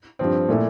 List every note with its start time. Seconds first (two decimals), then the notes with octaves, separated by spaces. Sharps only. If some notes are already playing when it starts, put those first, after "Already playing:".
0.19 G2 F3 C4
0.49 A#2 A3 E4